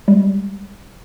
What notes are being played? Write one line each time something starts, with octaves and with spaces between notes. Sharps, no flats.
G3 G#3